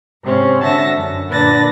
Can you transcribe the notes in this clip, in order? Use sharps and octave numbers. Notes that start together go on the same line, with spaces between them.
G#2 C3 C4 C#4
D3 F#4 E5 A5 A#6
F#2
A#2 D3 D4 B4 A6 A#6